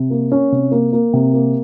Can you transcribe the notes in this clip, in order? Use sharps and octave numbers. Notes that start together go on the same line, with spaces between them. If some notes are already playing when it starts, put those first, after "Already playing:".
Already playing: C3
A#3
C#4
C3
A#3
A#3
C3
A#3